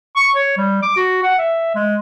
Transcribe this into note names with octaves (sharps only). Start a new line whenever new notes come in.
C#6
C#5
G3
D6
F#4
F#5
E5
G#3